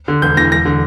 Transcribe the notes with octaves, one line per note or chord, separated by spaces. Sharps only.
D3
E1 G6
E3 A#6
E1 A#6
D3